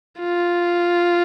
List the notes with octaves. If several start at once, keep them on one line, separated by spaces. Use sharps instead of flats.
F4